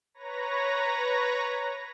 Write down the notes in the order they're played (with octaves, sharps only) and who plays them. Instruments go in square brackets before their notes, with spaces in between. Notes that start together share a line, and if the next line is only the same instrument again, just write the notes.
[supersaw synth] B4 C#5 A#5 A#6